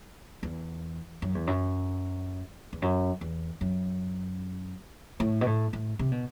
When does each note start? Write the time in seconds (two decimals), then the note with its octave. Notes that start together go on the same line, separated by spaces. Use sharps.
0.43 E2
1.22 F#2
1.35 E2
1.47 F#2
2.73 E2
2.82 F#2
3.21 E2
3.61 F#2
5.20 A2
5.41 B2
5.47 A2
5.73 A2
5.99 C3
6.12 B2